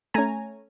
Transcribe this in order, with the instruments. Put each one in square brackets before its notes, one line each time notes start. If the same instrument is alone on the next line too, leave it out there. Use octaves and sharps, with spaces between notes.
[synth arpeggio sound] A3 C#4 G#5 A#5